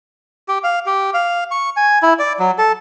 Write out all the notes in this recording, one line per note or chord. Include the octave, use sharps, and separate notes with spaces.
G4
F5
G4
F5
C#6
G#5
E4
D5
F#3
A4